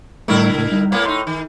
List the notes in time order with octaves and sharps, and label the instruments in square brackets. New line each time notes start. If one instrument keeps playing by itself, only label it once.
[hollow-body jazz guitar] A2 G3 A3 [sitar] D3 E4 A#4
[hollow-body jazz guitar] C#2 A2
G3 D#4
[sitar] A2 A#3 B3
[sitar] A2 D#4 [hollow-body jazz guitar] C6
[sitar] D#3